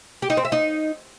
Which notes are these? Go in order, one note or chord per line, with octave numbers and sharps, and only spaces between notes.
G4
D#4
C4
E5
D#4